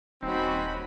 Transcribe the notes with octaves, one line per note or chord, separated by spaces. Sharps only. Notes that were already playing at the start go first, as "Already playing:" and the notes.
D#1 C4 C#4 D#4 F#4 B5